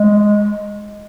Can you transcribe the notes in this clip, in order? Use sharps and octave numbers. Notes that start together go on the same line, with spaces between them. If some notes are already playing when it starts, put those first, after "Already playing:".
Already playing: G#3